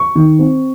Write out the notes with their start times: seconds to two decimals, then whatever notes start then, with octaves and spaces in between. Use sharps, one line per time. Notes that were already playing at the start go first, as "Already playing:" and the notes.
Already playing: C#6
0.15 D#3
0.39 C4